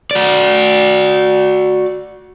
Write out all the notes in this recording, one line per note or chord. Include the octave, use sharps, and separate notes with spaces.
F#4 D5